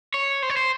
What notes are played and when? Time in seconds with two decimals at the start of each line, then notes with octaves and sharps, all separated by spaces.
0.14 C#5
0.42 C5
0.50 C#5
0.57 C5